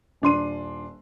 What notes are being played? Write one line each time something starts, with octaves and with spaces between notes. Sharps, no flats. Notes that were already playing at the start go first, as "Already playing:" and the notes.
D#1 D4 C6 D#7